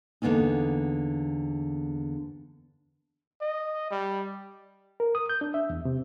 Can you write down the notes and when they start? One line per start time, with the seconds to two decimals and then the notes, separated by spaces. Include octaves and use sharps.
0.22 E2 D3 A#3 B3 C#4 D#4
3.41 D#5
3.91 G3
5.00 A#4
5.15 D#6
5.29 G6
5.41 D4
5.54 E5
5.70 E2
5.85 C3